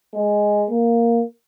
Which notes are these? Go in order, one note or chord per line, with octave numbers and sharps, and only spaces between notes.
G#3
A#3